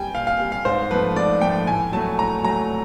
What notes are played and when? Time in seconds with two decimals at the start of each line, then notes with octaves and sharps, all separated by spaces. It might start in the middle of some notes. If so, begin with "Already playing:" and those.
Already playing: G3 G5 G#5
0.14 A#2 F5
0.27 F5
0.40 G3
0.52 F5
0.65 G#2 C5
0.91 F3 A3 B4
1.16 G#2 D5
1.41 F3 A3 G5
1.67 A2 G#5
1.92 F#3 A3 A5
2.19 A2 A#5
2.44 F#3 A3 A#5